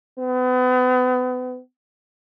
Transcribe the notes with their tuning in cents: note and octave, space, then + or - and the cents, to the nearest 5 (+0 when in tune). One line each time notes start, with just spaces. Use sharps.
B3 +35